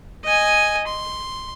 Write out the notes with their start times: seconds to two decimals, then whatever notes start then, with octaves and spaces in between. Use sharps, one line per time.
0.24 D#5 G#5
0.87 C6